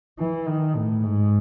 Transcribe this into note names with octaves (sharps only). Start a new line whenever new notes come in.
E3
D#3
A2
G#2